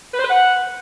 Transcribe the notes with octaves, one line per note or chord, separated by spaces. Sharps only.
B4
C5
B4
F#5